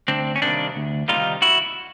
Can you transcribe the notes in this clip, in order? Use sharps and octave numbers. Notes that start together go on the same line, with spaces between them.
D2 C4 D4
C#4
C3 D#3 G3 A#3 C4 D4
D2
C3 D#3 G3 A#3 D#4 F4
E4 F#4